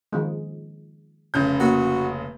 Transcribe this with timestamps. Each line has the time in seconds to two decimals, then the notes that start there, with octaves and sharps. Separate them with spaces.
0.13 D#3 F3 G#3
1.34 F1 C#3 G6
1.60 A#3 F#4